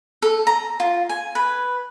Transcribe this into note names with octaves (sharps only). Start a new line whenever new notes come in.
A4
A#5
F4
G#5
B4